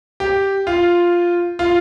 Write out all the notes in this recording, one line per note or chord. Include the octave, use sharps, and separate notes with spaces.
G4
F4
F4